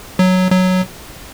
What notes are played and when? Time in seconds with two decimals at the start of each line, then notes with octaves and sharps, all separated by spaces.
0.19 F#3
0.52 F#3